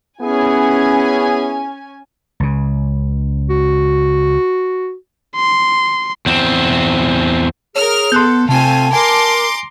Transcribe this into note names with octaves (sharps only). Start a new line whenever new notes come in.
B3 C#4 E4 G#4 G#5
C#2 C#3
F#4
C6
E2 C4
G#4 A#4 C#5 F6
B3 A4 C6 F#6 G6
C3 A3 C4 F4 G#5 A5
A#4 G#5 A#5 C6 D6